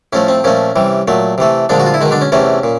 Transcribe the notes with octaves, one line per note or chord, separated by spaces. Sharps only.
A2 F3 A3 C#4
C4
A#2 F3 A3 C#4
C3 E3 G3
A#2 F#3 A3
C3 E3 A3
A#2 D3 F3 G#3 D4
F#4
F4
E4
B2 D#3 G#3 D#4
D3 D4
C#4
E2 C3 E3 A3 C#4
A#2